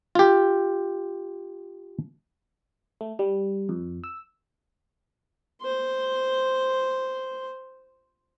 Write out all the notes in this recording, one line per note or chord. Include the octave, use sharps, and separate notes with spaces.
F4 G4
A3
G3
F2
E6
C5 C6